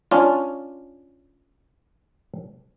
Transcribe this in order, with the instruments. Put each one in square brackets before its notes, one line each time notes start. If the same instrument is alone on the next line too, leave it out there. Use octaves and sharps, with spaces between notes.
[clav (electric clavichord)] C#4 D4 F4